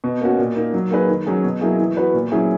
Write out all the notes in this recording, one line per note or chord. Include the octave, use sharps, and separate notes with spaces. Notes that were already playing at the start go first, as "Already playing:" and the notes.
B2
A#3 C#4 F#4
A#2
A#3 D#4
F#3
A#3 D#4 G#4 B4
D#3
F#3 C#4 G#4
B2
F#3 A#3 E4 G#4
E3
B3 F#4 B4
A#2
F#3 C#4 E4 G#4